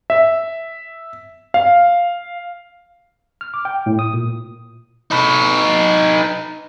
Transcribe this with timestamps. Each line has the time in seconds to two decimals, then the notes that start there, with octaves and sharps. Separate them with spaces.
0.10 E5
1.54 F5
3.41 F6
3.54 D6
3.65 G5
3.86 A2
3.99 D#6
4.14 A#2
5.11 D#4 B4